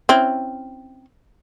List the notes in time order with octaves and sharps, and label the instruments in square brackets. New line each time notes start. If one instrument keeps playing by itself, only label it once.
[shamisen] C4 C#4 E4